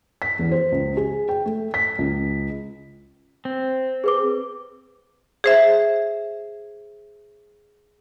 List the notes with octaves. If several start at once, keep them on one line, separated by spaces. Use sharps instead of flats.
B6
E2
C5
C#2
G#4
G5
A3
B6
C#2
C4
G#4 B4 D6
G#4 C5 E5